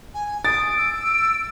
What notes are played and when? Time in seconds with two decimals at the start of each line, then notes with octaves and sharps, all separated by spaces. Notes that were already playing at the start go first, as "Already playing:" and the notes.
0.14 G#5
0.45 D#6 A6 D7
0.78 E6